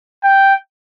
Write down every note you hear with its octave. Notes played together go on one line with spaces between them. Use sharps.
G5